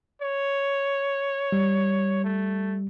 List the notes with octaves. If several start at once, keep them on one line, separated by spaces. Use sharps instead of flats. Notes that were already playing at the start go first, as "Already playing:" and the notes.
C#5
G3
A3